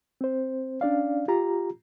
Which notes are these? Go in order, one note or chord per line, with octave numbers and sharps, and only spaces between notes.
C4 C5
C#4 D4 D5 F5
F4 G4 A#5